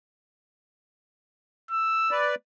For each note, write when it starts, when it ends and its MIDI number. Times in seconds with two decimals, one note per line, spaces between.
1.71 2.17 88
2.11 2.35 71
2.11 2.35 74